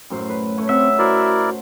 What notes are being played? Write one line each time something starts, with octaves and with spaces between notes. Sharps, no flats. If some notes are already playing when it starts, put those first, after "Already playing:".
F#2 A2 C5
B4
A3 C#5 G#5
C4 E5 F#5
E4 F#4 A#4 C5 D5